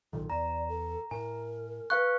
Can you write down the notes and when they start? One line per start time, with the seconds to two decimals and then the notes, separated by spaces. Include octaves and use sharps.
0.13 B1 A#2 D#3 A4
0.30 E2 D5 A#5
0.69 A4
1.11 A2 A#4 G#5
1.90 B4 F5 C#6 F#6